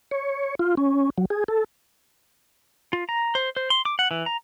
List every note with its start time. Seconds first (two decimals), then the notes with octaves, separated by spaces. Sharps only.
0.11 C#5
0.59 F4
0.77 C#4
1.18 F#3
1.30 G#4
1.48 A4
2.93 F4
3.09 A#5
3.35 C5
3.57 C5
3.70 C6
3.85 D6
3.99 F#5
4.11 E3
4.26 A#5